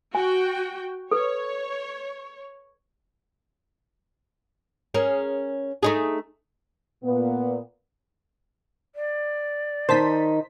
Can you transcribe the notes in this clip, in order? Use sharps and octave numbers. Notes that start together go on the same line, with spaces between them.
F#4 G5 G#5
A4 B4 C#5
C#4 G#4 A#4
A3 D#4 G#4
A#2 B3
D5
D#3 D#4 C5 A5 B6